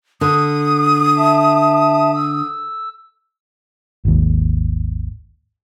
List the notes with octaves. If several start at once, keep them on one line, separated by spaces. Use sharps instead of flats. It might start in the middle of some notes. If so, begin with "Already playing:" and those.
D3 D#6
E5 A5
E6
G#1 D#2